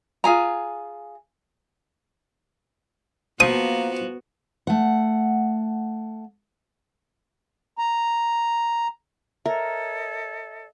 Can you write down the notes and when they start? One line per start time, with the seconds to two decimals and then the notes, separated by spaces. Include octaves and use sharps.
0.24 F4 G#4 G#5 A#5
3.40 F3 A#3 B3 F#4 D#6
4.67 A3 F#5
7.78 A#5
9.46 A4 A#4 C#5 D#5 E5